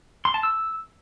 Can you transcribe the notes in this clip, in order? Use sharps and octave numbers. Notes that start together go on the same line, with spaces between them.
C6
A5
E6